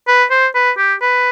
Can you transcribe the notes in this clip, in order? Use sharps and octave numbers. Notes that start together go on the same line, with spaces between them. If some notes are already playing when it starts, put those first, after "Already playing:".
B4
C5
B4
G4
B4